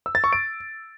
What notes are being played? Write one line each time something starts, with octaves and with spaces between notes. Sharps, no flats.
E6
A6
C#6
D7